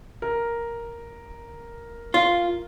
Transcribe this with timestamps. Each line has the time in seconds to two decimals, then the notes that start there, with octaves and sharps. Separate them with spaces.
0.22 A#4
2.14 F4